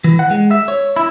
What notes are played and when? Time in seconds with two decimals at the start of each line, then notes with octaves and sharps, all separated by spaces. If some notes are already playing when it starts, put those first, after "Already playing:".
0.04 E3
0.19 F#5
0.31 G#3
0.51 E5
0.68 C#5
0.96 E4